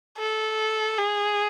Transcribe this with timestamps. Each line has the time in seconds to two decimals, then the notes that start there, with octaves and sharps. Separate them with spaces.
0.18 A4
0.98 G#4